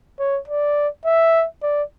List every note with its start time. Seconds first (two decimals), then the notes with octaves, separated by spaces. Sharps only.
0.19 C#5
0.48 D5
1.06 E5
1.63 D5